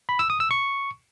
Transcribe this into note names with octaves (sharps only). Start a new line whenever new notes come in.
B5
E6
D#6
E6
C#6